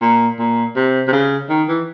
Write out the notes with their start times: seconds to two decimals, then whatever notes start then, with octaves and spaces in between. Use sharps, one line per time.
0.02 A#2
0.38 A#2
0.76 C3
1.08 C3
1.12 C#3
1.50 D#3
1.69 E3